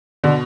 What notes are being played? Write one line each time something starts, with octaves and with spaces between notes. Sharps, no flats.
B2 D3